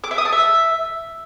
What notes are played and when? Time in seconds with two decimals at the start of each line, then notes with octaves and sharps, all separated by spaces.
0.04 D6
0.11 E5
0.18 D#6
0.25 A5
0.32 E5